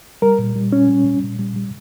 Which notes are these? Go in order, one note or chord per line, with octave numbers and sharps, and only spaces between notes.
G3 A#4
A#2
G3
A#2 C#4
G3
G3
A#2
G3
G3